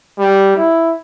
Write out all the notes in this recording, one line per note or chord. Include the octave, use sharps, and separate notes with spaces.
G3
E4